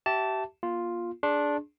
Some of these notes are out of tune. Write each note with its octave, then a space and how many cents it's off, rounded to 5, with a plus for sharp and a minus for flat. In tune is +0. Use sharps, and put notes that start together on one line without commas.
G4 -35 E5 +0 A5 +0
A#3 +40 F4 +0
D4 -5 G#4 +15 C6 +35